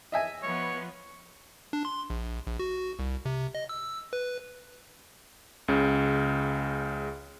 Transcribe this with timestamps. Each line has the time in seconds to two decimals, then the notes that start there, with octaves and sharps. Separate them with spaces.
0.12 D#5 E5 G#5
0.42 F3 B3 C#5
1.73 D4
1.85 C6
2.10 A#1
2.46 A#1
2.59 F#4
2.99 C2
3.25 C3
3.55 D#5
3.69 E6
4.13 B4
5.68 C#2 C#3